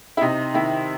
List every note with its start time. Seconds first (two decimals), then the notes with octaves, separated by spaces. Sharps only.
0.17 E4
0.21 C3 D#4
0.54 D#3 E4